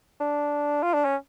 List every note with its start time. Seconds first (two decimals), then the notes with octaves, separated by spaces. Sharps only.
0.20 D4
0.83 F4
0.94 D4
1.05 C#4